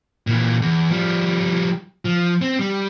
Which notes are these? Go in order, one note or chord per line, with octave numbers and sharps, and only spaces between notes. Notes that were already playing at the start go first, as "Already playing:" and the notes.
A#2 E3
E2
F3 G3
F3
C4
G3